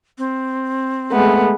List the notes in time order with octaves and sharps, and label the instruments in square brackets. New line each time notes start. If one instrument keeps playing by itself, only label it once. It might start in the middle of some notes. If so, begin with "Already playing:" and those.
[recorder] C4
[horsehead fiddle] G#3 A3 [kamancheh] B3